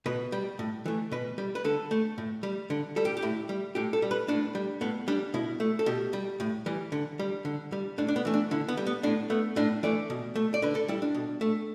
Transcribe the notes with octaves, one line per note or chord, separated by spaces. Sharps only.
B2 B4
G3
A2
E3 A3
B2 B4
G3
B4
D3 A4
A3
A2
G3
D3
G3 A4
G4
G4
A2 E4
G3
A2 G4
A4
G3
B4
A2 D4
G3
A2 B3
G3 D4
B2 E4
A3
A4
B2 G4
G3
A2
E3 G3
D3
G3
D3
G3
A2 D4
D4
B3
E3 A3
D4
D3 E4
B3
G3
B3
A2 D4
A3 B3
A2 D4
E3 A3 D5
B2
A3
D5
D3 B4
A4
G3 E4
D4
B2
A3